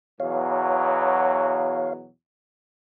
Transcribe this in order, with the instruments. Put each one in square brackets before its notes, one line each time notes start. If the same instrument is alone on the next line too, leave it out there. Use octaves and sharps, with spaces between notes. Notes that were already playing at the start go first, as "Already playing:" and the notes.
[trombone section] E2 B2 F#3 [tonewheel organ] C#5 F5